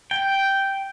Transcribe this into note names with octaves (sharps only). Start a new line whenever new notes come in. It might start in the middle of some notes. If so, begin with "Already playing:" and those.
G5